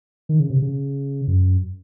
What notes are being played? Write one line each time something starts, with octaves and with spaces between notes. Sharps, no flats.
D#3
C#3
C3
C#3
F#2